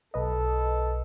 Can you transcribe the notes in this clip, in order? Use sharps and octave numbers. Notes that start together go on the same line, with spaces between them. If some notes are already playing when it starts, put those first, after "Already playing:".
B1 A4 B4 D#5